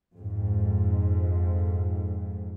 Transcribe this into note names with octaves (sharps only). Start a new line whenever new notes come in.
F2 G#2